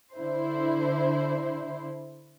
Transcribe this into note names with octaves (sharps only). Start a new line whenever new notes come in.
D3 E4 C5